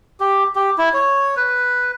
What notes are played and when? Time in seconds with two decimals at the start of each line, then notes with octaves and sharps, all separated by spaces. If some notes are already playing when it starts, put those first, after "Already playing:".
0.20 G4
0.55 G4
0.78 E4
0.93 C#5
1.37 B4